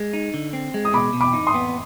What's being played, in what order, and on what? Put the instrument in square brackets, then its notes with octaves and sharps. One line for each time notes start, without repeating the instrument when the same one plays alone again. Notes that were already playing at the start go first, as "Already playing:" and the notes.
Already playing: [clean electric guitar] G#3
D#4
D3
C4
G#3
[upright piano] D#6
[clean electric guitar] B2 [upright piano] B5 D6
[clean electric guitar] B2
[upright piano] B5 D6
[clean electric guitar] D#4
[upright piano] C6 D#6
[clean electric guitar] B3